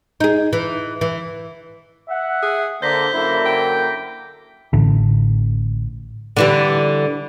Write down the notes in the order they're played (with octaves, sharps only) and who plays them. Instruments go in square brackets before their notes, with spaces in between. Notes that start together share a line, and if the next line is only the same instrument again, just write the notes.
[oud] D#4 G#4
E3
E3
[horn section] E5 F#5
[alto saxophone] G#4
[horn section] D3 [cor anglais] A#3 [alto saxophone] C5 [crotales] G6 A#6 B6
[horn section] F#2 D3 A#3 [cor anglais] E4
[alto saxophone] G5
[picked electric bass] A1 A2 D3
[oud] D3 E3 G3